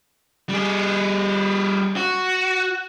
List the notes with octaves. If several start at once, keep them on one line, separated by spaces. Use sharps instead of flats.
G3 G#4
F#4